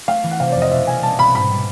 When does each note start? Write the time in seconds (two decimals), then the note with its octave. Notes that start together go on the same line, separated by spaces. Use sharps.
0.08 A3 F5
0.23 E3
0.31 F#5
0.40 C3 F5
0.52 F2 D5
0.62 D#5
0.71 B2 E5
0.87 A#3 G#5
1.03 G3 A5
1.19 B2 B5
1.34 G#2 B5
1.50 G3